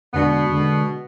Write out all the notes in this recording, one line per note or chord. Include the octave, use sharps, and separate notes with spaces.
E2 B2 D3 G#3 B3 D4 F#4
D3 G#3 D4